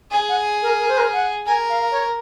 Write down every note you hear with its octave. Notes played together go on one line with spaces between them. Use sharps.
G#4 G#5
F#5
A#4
A#4
C5
A#4
F#5
A#4 G#5
F5
C#5